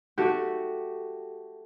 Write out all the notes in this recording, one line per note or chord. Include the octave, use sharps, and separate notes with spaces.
A3 F#4 G4